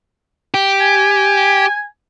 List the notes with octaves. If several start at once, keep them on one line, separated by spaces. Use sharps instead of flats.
G4
G#5